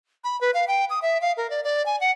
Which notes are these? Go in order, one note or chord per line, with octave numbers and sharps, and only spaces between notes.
B5
B4
F5
G5
D#6
E5
F5
A#4
D5
D5
G#5
F#5